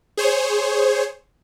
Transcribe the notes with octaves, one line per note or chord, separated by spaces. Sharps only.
G#4 C5 C#5